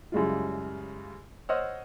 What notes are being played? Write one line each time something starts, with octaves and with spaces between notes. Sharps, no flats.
F#2 C#3 G3 G#3 E4 F4
C5 C#5 D#5 F#5 E6 F6